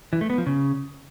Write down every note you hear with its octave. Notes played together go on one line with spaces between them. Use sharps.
E3
A3
B3
F3
C#3